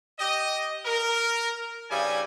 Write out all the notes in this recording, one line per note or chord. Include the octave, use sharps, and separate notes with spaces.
G4 D#5
A#4
G2 C#3 G3 E4 G#5